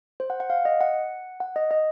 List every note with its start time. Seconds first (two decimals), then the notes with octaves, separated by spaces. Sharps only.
0.20 C5
0.30 F#5
0.40 F#5
0.50 F5
0.65 D#5
0.81 F#5
1.40 F#5
1.56 D#5
1.71 D#5